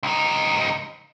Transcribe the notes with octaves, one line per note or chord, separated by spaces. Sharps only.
C#2 D#4